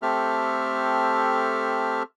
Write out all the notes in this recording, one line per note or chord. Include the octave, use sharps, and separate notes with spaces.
A3 C4 G4 A4 E5 F6